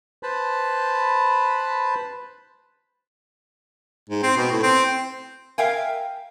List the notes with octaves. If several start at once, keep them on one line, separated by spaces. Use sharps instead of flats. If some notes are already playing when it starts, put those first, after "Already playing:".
B4 C5 A5 B5
G#2
C4
B2
A2
C4
A#4 E5 F5 G5 G#5